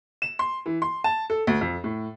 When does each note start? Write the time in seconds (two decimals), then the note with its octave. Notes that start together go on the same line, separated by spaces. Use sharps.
0.22 E7
0.39 C6
0.66 E3
0.82 C6
1.04 A5
1.30 A4
1.47 D2
1.61 F2
1.84 A2